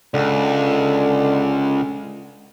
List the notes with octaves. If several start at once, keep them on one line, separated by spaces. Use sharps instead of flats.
C#2 D3